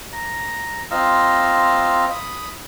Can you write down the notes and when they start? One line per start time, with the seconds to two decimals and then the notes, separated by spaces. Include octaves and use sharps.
0.13 A#5
0.91 C4 F4 D#5 F5 A#5 E6
2.11 B5 D#6